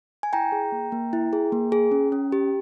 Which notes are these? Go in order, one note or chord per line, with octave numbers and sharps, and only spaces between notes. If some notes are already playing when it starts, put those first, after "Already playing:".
G#5
E4 G5 A#5
G#4
A#3
A#3
E4
G#4
A#3
G#4
C#4
C#4
G4